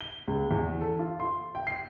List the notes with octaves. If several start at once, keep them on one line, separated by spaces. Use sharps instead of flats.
G7
C#2
E2
A4
F4
C6
G5
C7